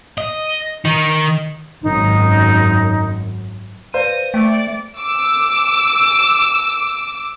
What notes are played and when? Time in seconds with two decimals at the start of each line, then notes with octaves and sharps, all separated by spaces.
0.18 D#5
0.85 D#3 D#4
1.83 G#1 F#2 D#4
3.94 B4 C5 D5 F5 A#6 D#7
4.34 A3 D5 G5 C#7
4.99 D6 E6